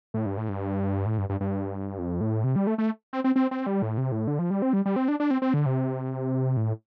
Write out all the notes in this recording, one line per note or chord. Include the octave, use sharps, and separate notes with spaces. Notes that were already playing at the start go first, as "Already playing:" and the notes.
A2
G2
A2
G2
A2
G2
G2
G2
F2
A2
C3
G3
A3
A3
C4
C4
C4
C4
G3
A2
C3
A2
D3
F3
G3
C4
G3
G3
C4
D4
D4
C4
C4
D3
C3
A2